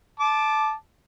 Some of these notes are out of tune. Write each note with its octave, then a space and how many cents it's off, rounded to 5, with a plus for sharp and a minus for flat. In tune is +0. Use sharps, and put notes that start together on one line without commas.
A5 -15 D6 +10